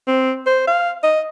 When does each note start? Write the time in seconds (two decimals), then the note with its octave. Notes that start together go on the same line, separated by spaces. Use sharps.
0.08 C4
0.47 C5
0.67 F5
1.03 D#5